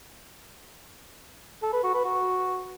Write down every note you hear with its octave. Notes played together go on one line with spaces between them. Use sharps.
A4
B4
F#4
B4
F#4